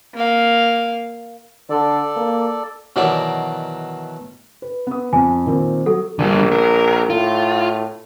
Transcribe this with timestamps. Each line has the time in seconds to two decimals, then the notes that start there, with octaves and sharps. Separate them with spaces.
0.15 A#3 F5
1.70 D3 A4 D5
2.17 A#3
2.96 B2 D#3 E3 F#3 D5
4.62 B4
4.87 B3 D#6
5.13 F2 G#5
5.46 A#2 D#3 C4
5.86 F#3 A4
6.19 A#1 D3 G3
6.52 A#4
7.10 A2 F4